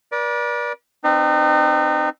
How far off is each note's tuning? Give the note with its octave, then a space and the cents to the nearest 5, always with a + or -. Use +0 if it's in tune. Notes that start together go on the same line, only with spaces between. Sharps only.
B4 -45 D5 -5
C4 +0 D#4 -35 B4 +20